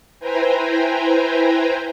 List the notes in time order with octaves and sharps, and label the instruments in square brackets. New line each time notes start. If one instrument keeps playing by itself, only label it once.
[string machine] E4 B4 C5 G5 G#5 A#5